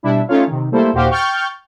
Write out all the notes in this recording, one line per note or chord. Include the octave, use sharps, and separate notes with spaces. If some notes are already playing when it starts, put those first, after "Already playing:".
B2 G3 D4 E4
A3 C#4 D#4 F4 C#5 F5
C3 D#3
G3 A3 A#3 E4 A4 C5
D#2 A#2 F#4 G4 C5 F5
G5 C#6 F6 G6 A6